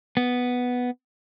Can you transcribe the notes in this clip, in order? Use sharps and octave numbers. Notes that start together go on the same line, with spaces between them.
B3